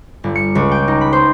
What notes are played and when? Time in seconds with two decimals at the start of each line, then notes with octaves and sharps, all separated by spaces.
0.24 G1
0.36 C#7
0.55 C#2
0.72 G5
0.88 D#4
1.01 B5
1.13 C5